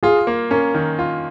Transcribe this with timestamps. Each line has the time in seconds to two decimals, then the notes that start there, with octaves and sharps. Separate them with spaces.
0.03 F4 G#4
0.27 A#3
0.51 C#4 A#4
0.74 D#3
0.99 F4